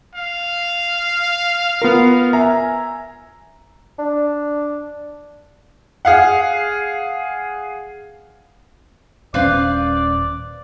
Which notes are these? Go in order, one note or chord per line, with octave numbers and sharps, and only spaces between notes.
F5
B3 F4 A#4
E5 G#5 A#5
D4
G#4 F5 F#5
D#1 C#4 B4 C5 D5 F5